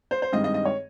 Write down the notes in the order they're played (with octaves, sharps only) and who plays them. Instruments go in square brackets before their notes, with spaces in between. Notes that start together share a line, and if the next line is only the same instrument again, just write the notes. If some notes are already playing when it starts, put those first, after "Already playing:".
[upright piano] C5
C5
G2 D#3 G#3 C4 D#5
D#5
D#5
C#5